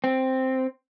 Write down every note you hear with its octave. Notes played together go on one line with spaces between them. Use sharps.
C4